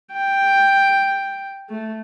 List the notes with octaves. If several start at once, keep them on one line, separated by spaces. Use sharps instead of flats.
G5
A3